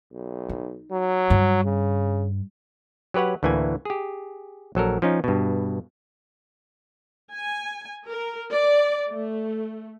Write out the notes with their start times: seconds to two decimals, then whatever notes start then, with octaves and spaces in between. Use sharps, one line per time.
0.13 B1
0.49 D#4
0.91 F#3
1.30 G2
1.65 C#3
3.14 F#3 G4 B4 C#5 F#5
3.43 D2 A2 E3 A#3 G#5
3.85 G4 G#4
4.75 A#1 F#3 A4 A#4
5.02 F3 C#4 D#4
5.24 G2 B2
7.33 G#5
8.06 A#4
8.50 D5
9.13 A3